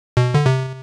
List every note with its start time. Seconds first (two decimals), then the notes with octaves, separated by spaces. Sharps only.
0.17 B2
0.34 D3
0.46 C3